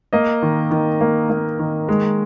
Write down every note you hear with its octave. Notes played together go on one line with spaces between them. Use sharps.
A#3 D#5
D#3
D#3
A#3
A#3
D#3
G#3